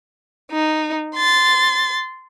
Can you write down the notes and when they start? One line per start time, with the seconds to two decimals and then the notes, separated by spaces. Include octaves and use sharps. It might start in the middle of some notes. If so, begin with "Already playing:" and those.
0.51 D#4
1.15 C6 A6